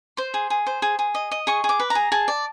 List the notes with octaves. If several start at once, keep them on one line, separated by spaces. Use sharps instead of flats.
C5 C6
G#4
G#4
C5
G#4
G#4
D#5
D#5
G#4 C#6
G#4
D6
B4
A#5
G#4
G#4 A5
D5